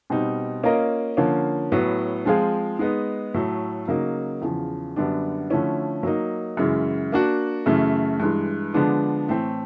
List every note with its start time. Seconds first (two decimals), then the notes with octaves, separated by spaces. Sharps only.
0.10 B2 G3 C4 D#4
0.63 A#3 C#4 F4 A#4 D#5
1.17 D3 F3 A#3 C#4
1.72 A2 F#3 B3
2.26 F3 G#3 C4 F4 G#4
2.79 G#3 B3 D#4
3.34 A2 F#3 A3
3.88 C#3 F#3 A#3 D#4
4.41 E2 C#3 F3
4.96 F#2 D3 G3 B3 D4
5.50 D3 F3 A3 C#4 E4
6.03 F#3 A#3 D#4
6.57 F#2 C#3 E3 G#3
7.12 A#3 D4 F#4
7.66 F#2 C#3 E3 A3
8.20 G2 E3 G#3
8.74 D3 F3 G#3 B3 D4
9.28 A2 E3 A3 C4